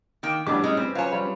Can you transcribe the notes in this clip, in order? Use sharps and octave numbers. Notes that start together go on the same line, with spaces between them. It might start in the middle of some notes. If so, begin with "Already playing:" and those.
D#3 A#3 G5
A1 E3 G3 B3 D4 G4 D6
G#3 C#4 D#4
C4 C#4 B4 C5
F#3 F4 C#5 G#5
G3 F4 B5